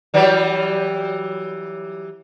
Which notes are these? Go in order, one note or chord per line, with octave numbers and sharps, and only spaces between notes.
E3 F#3 G3